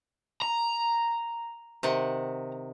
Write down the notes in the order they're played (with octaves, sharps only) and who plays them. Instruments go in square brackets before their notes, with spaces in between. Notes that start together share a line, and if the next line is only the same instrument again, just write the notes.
[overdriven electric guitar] A#5
[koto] C3 D#3 F#5